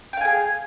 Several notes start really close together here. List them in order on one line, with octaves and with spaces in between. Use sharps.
G5 F5 G#5 G#4